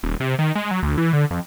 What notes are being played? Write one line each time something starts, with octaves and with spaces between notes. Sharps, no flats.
D#1
C3
D#3
G#3
F#3
D2
E3
D3
F2